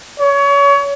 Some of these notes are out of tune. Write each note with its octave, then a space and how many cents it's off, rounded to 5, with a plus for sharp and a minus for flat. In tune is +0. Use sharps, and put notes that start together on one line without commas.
C#5 +25